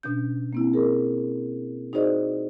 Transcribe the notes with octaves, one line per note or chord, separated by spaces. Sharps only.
B2 C#4 D4 G6
A#3 C4 E4
G#4 A#4
D#4 F#4 G#4 C5 D5 D#5